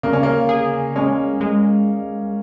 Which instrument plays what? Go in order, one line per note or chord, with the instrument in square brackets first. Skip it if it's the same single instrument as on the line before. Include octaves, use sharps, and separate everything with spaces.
[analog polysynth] C#3 [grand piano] A#3
[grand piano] C#4
A#3
[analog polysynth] G#4
[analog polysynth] G#3 [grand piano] C#4
[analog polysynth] G#3